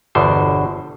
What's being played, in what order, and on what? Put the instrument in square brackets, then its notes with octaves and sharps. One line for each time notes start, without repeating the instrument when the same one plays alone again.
[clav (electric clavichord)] G1 E2 B2 D3 C5